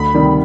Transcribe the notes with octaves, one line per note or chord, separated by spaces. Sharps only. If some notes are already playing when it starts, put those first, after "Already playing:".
Already playing: D2 B5
C3 D#3 G3